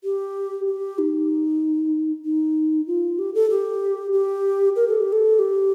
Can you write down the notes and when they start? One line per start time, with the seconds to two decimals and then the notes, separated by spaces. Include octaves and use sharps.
0.04 G4
0.67 G4
0.99 D#4
2.25 D#4
2.87 F4
3.19 G4
3.35 A4
3.51 G4
4.13 G4
4.76 A#4
4.88 A4
5.00 G4
5.12 A4
5.39 G4